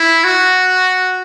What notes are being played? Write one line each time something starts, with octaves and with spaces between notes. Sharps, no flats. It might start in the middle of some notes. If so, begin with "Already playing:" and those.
Already playing: E4
F#4